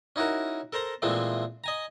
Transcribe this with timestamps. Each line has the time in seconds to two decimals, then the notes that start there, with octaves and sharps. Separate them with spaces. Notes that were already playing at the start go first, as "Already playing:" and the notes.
0.16 C#4 D#4 E4 F#4 A#4
0.73 A4 A#4 C5 A#5
1.02 A#2 E3 F3 G#3 A3 C4
1.64 D#5 G#5 A#5